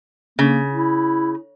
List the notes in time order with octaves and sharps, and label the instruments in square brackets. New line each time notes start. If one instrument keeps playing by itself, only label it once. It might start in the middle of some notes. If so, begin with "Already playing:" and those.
[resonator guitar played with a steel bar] C#3 [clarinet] A#3
[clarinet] E4